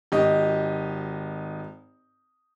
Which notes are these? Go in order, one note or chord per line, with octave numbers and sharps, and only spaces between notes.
G#1 G4 D#5